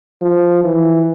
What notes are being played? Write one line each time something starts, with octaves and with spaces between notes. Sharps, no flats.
F3
E3